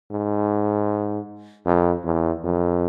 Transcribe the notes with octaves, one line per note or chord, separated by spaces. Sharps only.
G#2
F2
E2
F2